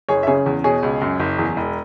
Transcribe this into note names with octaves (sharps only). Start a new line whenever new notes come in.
F#1 G#4 C#5
E5
C#3 G#4 C#5
E2
B2 G#4 C#5
C#2
F#2
F#1
E2
E1